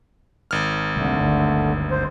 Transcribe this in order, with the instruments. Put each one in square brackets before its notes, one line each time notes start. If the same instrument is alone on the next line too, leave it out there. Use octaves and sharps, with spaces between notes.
[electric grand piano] G#1 F6
[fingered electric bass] C2 [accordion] D3 A3
[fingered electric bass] G1 D2
[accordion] C5